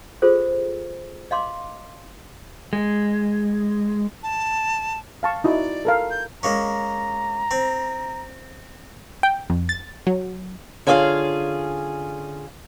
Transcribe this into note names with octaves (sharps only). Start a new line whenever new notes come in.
F4 G#4 A4 C5
D#5 F5 C6 D6
G#3
A5
F5 A5 C#6
D#4 E4 F#4 D5
A4 A#4 F5
G6
G#3 A#3 C#4 A#5
C4
G5
F2
A6
F#3
D3 C#4 F4 G#4 D5 F5